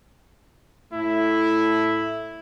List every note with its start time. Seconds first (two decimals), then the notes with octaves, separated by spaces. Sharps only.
0.93 A2 A3 E4